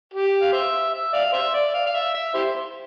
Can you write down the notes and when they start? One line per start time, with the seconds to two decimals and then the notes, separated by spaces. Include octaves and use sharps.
0.14 G4
0.42 F5
0.53 C5 E5
0.94 E5
1.14 D5 F5
1.33 C5 E5
1.54 D5
1.74 F5
1.86 F5
1.94 E5
2.14 E5
2.34 E4 G4 C5